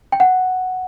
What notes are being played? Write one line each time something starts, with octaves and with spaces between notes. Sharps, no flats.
G5
F#5